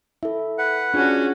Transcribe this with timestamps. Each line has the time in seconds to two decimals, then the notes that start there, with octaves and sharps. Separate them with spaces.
0.23 E4 A4 E5
0.58 B4 F#5
0.94 C#4 D4 F4 F#4 G#4